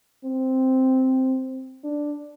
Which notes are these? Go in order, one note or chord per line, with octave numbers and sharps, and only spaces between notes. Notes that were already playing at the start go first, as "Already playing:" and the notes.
C4
D4